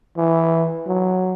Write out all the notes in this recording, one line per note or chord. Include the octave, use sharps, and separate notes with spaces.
E3
F#3